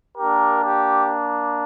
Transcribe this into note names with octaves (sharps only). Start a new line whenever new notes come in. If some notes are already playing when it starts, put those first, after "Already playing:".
A#3 D4 G4 A#4
G4